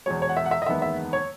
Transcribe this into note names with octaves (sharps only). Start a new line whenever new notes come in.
E2 B2 G#3 C#5
C#5
F#5
E5
F#5
E5
D#5
F#1 E2 D#3 G#3 B3 E5
E5
C#5